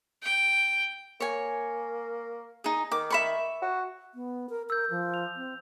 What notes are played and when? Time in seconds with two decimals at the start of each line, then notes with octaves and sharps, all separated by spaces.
0.23 G5
1.20 A#3 C#5 G#5
2.64 D#4 G#4
2.92 D#3 D6
3.10 E5 B5 C#6
3.62 F#4
4.15 B3
4.49 A#4
4.70 A#4 E6 G6
4.90 F3
5.14 F7
5.36 C4